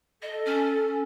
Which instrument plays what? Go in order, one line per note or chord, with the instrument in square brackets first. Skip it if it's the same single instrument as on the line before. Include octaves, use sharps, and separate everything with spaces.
[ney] A4 [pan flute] D#5
[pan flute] C#4